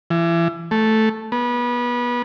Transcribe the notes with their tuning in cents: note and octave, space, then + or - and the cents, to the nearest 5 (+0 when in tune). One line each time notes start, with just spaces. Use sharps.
E3 +30
A3 +0
B3 -25